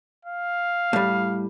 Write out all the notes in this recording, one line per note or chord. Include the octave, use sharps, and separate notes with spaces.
F5
A2 G3